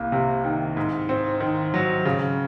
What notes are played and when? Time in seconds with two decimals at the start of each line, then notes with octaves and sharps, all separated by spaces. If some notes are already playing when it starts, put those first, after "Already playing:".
Already playing: C2 A#3
0.12 C3
0.44 D#3
0.77 G#2
1.09 C4
1.40 D#3
1.74 F#3
2.05 C#3